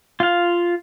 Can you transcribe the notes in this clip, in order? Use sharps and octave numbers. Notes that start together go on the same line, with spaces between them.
F4 F5